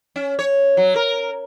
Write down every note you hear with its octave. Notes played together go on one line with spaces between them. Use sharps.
C#4
C#5
F#3
A#4